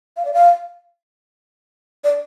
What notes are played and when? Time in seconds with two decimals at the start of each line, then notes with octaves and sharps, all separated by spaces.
0.17 F5
0.25 D5
0.34 F5
2.04 D5